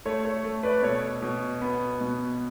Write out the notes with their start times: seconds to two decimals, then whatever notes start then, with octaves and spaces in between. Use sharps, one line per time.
0.05 A3 A4 C#5
0.24 A4 C#5
0.44 A3
0.63 B4 D5
0.83 B2 A4 C#5
1.22 B2
1.62 B3
2.01 B2